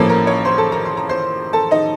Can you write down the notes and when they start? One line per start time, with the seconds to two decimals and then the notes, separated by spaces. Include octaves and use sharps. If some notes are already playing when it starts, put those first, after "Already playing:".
Already playing: A1 A2 F3 A#3 C#4 A4 A5
0.09 A#4 A#5
0.27 C#5 C#6
0.45 C5 C6
0.58 A4 A5
0.72 A#4 A#5
0.85 C6
0.97 A#5
1.09 C5 C6
1.53 A4 A5
1.71 D#4 D#5